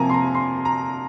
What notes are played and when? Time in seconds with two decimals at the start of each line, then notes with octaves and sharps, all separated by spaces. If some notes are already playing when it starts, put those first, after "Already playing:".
Already playing: C3 F3 A#3 G#5 A#5
0.10 C6
0.14 A#5
0.35 C6
0.65 A#5